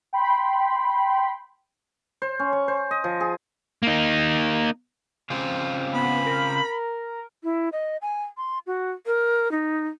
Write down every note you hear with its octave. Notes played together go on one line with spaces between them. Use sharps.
G5 B5 C6
C5
C#4
C#6
C5
D#5
F3
G#4
A#3 D#4
C#3 C4 F4
B3 B5
A#4
E4
D#5
G#5
C6
F#4
A#4
D#4